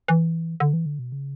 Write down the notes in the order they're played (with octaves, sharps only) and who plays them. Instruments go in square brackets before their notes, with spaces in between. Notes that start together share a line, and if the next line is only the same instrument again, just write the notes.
[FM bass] E3
D3
E3
D3
B2
C#3